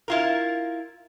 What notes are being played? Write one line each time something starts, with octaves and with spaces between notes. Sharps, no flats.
E4 F4 A#4